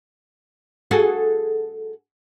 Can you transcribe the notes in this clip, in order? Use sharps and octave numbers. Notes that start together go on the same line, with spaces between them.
F#4 G#4 A4